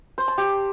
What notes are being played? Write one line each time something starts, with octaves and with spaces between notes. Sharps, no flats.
C5
A5
G4